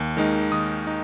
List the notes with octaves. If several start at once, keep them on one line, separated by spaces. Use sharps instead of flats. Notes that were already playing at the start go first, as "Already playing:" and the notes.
Already playing: D#2
D#3 G#3 D#4
D#2 D#6
D#4